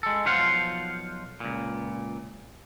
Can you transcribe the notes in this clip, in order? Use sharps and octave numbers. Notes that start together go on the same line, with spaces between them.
G#3 A4
B1 F3 F4 C5 F5 F#5
C#2 A#2